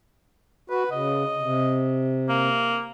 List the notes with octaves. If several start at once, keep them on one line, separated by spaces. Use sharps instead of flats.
F#4 B4
C#3 D#5
C3
A#3